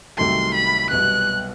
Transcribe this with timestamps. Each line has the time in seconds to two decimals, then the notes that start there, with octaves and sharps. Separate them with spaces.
0.18 C2 C3 D#3 F#3 A3 C6
0.54 B5
0.90 C2 B2 F#3 B3 F#6